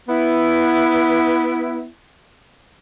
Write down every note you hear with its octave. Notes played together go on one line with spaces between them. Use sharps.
B3 E4